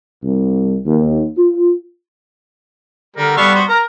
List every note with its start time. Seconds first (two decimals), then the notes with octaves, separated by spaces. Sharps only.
0.22 C2
0.86 D#2
1.37 F4
3.16 D3 G3 A#4
3.37 G3 B3 A4 F5 C#6
3.55 F#4 C5
3.69 A#4 A#5